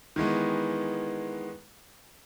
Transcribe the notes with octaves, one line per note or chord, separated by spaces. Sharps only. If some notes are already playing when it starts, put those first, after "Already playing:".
D#3 E3 G#3 B3